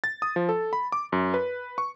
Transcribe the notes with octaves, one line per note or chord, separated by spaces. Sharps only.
A6
D#6
F3
A4
B5
D6
F#2
B4
C#6